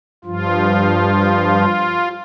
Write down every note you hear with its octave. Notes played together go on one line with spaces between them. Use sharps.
G2 F3 F4